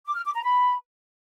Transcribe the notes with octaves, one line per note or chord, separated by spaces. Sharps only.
D6
F6
D6
A#5
B5